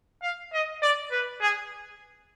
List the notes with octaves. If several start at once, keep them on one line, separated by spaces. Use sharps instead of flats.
F5
D#5
D5
B4
G#4